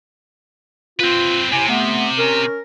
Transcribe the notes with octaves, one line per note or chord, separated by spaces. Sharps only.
C4 F4 B4
D#2 C3 E4 G#5
A3 B3
C#4 A#4